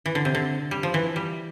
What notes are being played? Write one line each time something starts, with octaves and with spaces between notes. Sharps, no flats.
E3
D3
C3
D3
G3
F3
E3
G3